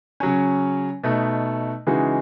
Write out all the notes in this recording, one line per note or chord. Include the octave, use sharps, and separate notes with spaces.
C#3 F#3 C#4
B2 A3 D#4
C#3 E3 G#3 D#4 F#4